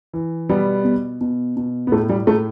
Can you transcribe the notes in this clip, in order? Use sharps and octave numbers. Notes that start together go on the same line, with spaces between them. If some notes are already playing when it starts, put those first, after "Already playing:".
E3
B2 G3 B3
B2
B2
B2
B3
A2 A3
G3
A2 A3